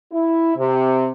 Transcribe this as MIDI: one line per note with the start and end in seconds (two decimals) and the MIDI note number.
0.12 0.51 64
0.56 1.12 48